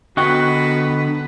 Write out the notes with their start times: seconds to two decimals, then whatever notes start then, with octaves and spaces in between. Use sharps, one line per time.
0.17 D3 B3 F#4 B4 D#5 G5 C#6 F#6